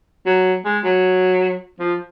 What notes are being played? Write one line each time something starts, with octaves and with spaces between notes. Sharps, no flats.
F#3
G#3
F#3
F3